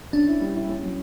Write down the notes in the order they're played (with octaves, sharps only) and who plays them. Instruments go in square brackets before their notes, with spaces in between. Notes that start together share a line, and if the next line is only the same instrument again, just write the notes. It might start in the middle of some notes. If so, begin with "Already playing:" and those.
[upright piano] C#4 [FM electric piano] D4
[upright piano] E4
G3
E4
C#4
F#3